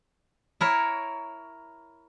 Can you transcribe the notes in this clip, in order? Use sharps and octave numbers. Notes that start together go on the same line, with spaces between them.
E4 A#4 C#5